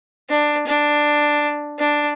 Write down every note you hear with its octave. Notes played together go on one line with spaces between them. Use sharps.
D4
D4
D4